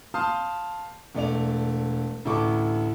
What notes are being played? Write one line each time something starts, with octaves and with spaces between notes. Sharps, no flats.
F5 A5 C6 D#6 F6 G6
E1 A3 D5 F7
A1 D2 E4 A4 C#6 D6